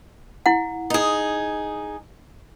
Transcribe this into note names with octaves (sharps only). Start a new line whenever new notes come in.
E4 F#5
D#4 G#4